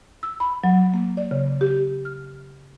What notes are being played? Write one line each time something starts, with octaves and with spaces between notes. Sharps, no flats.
E6
B5
F#3
A#3
D5
C#3
G4
F6